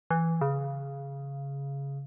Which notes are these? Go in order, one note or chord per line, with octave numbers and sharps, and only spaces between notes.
E3
C#3